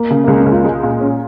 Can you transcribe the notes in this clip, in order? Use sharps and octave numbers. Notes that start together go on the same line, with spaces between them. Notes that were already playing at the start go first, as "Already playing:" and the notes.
Already playing: A#3
C#3
A#3
C#2 G#3
C#4
C#2
F4
G#3
A#2
C#4